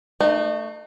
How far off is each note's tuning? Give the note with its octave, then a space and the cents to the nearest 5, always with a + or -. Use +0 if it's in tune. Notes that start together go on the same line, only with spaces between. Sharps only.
A3 +15 D#4 -40